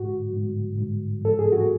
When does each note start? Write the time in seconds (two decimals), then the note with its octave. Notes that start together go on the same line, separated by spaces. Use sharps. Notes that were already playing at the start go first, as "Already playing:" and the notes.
Already playing: G#2 F#4
0.33 G#2
0.79 G#2
1.22 G#2 A4
1.39 G#4
1.52 F#4